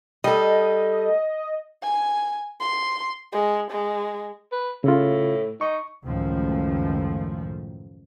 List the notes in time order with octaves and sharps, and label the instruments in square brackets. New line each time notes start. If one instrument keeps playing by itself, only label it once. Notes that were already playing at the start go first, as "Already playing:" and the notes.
[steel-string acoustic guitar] G3 A4 [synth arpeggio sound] D#5
[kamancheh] G#5
C6
G#3
G#3
[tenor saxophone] B4
[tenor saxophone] A2 [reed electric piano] C#3 F4
[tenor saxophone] D#4 [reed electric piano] C#6
[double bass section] C#2 F#2 A2 D#3 F3 A3